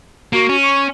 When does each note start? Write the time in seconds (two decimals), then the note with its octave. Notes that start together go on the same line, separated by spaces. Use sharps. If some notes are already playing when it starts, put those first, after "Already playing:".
0.33 A#3 F#4
0.49 C#4
0.62 C#6